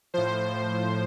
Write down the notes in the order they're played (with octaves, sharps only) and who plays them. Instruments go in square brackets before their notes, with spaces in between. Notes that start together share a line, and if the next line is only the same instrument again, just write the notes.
[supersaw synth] A2 F3 C5